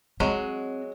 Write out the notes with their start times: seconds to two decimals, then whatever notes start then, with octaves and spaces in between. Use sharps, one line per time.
0.20 F#3 G#3 C4